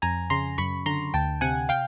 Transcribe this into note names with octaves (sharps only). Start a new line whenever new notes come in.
F2 G#5 A#5
C#3 A#5 C6
F#2 B5 C#6
D3 A#5 C6
D2 G5 A5
C3 F#5 G#5
F5 G5